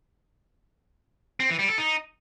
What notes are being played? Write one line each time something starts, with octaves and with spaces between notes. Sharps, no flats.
C4
E3
G3
A4
D#4